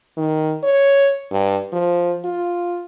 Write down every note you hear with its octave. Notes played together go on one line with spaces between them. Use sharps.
D#3
C#5
G2
F3
F4